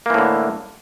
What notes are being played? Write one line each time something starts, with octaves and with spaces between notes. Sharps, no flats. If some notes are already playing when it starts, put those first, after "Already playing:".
A2 D3 E3 A#3